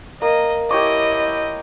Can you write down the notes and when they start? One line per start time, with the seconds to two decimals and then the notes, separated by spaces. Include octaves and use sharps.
0.22 A#3 D#5
0.71 E4 G4 C#5 D#5 D6